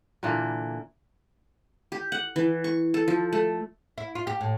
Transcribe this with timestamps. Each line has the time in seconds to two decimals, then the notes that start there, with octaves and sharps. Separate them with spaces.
0.23 A#2 D3 E3 A#3
1.92 G4
2.12 F#5
2.36 E3
2.64 C#6
2.94 A4
3.08 F3
3.33 A3
3.98 E4
4.15 F4
4.27 G4
4.41 A2